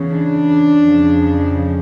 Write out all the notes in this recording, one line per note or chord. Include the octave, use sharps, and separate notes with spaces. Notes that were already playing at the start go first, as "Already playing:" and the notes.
Already playing: E2 C#3 E3
D4
F2 C#3 F3